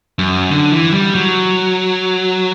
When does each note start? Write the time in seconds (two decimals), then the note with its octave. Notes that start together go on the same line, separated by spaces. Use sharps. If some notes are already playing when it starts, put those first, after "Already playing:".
0.19 F#2
0.50 D3
0.72 E3
0.93 G3
1.15 F#3